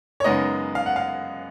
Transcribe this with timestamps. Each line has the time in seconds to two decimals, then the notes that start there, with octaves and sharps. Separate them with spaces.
0.20 C#5
0.24 F#2 C#3 G#3 B3 D#4 D#5
0.75 F5
0.86 F#5
0.96 F5